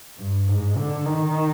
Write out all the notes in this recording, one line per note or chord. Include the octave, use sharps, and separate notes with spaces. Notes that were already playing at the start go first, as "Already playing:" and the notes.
G2
G#2
D3
D#3